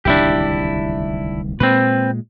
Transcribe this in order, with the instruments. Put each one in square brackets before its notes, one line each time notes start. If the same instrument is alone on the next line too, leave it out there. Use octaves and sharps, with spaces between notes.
[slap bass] D1 C2 D#3 [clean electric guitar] D4 E4 G4
[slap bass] A#2 G#3 [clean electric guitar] C4 B4